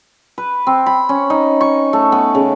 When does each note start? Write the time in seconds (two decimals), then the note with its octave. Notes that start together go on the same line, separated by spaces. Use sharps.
0.38 B4
0.67 C4
0.86 B5
1.09 C#4
1.30 D#4
1.61 C#6
1.93 A3
2.12 B3
2.35 C#3